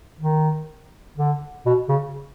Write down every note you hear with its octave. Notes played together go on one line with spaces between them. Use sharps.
D#3
D3
B2
C#3